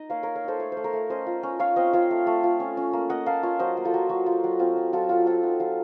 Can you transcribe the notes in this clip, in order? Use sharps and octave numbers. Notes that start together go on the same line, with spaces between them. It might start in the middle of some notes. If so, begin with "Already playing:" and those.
Already playing: D#4 D#5
A#3 C#5 F5
A#3 A#4 C#5
A#4 C#5
D#4 A4 C5
A3 C#5
A3 C5
A#4 C#5
A3
C#4 C5 D#5
F4
C#4
F4 C#5 F5
C4 C5 D#5
F4 C#5 F5
A3
A3
F4
C#4
C#4
A#3
A#3 D#5 F#5
A#3 F5 A5
F4 C#5 F5
F#3 C5 D#5
A#3
F4 A4
F#3
F#3 F#4
F4
F#3
C4 F4
F#3
F#3 F4 A4
F#3 F4 A4
C4 F4 A4
D#4 F#4
F#3 F4